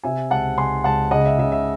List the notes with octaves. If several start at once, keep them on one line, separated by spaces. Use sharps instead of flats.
C3 E5 G#5
C#2 F#5 A5
C#2 G#5 C6
C#2 F#5 A5
C#3 D#5 F#5
E5
C#3 E5
E5